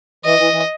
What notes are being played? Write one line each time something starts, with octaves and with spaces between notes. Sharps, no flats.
E3 D#5
E3
E3